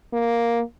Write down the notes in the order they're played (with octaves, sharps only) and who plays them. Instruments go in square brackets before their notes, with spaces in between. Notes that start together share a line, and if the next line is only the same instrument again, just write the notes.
[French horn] A#3